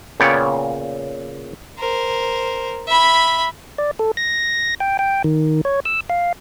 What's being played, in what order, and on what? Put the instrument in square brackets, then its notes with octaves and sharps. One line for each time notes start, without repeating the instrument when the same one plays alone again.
[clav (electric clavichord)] A#2 C#3 B3 C#5 D5 G5
[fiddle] A#4 C5
E5 B5
[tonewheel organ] D5
A4
A#6
G5
G5
D#3
C#5
E6
F5